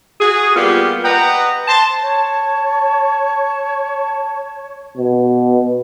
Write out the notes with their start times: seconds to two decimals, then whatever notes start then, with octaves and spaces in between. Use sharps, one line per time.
0.20 F#4 G#4
0.56 G3 A#3 B3 F4 G4
1.04 B4 D#5 F#5 G5 A#5
1.68 C5 A5
2.02 C#5 A5
4.97 B2